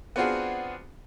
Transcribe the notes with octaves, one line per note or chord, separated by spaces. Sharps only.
B3 C4 D4 F4 F#4 G#4